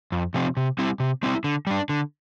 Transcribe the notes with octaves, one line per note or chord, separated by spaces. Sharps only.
F2
C3 F3 C4
C3
G3 C4 E4
C3
G3 C4 E4
D3
G3 D4
D3